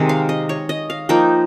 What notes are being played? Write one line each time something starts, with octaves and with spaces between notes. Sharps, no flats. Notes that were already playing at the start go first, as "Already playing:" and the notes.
Already playing: C3 D#3 G#3
F5
D#5
C#5
D#5
F5
F3 A#3 D#4 G5